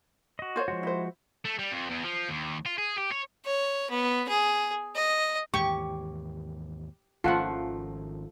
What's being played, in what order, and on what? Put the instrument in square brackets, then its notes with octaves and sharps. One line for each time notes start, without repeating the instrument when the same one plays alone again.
[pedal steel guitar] F#4 D#5
[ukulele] F4 C5 C#5
[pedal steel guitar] F3 G#3 F#4
[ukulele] E4 C5
[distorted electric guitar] A3
G3
F2
E2
F3
D#2
F4
G#4
G4
C#5
[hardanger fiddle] C#5
B3
G#4
D#5
[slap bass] D#2 G#2 E3 [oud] G4 [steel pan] C#6
[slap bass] G#1 D#3 C#4 [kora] F3 A3 [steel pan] F4 F#5